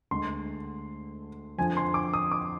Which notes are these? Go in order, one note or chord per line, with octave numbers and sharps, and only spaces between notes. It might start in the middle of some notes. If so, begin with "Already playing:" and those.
D2 D3 G#3 C6
F2 D3 F3 G#5
C6
D6
D#6
D6